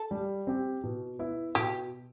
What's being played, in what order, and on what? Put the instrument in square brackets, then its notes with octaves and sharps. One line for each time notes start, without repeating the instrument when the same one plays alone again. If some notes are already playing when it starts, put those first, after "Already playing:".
Already playing: [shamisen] A4
[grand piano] G3
C4 G4
B2
B3 E4
[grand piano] B2 [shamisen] G4